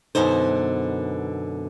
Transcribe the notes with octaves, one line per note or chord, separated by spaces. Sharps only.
F#2 B2 D3 D#4 C5